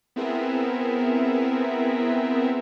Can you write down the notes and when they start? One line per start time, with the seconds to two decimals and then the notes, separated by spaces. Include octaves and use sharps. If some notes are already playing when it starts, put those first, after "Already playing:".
0.16 B3 C4 E4 G#4 A#4 E5